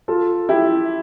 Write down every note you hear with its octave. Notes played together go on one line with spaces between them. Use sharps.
F4 A4
E4 G4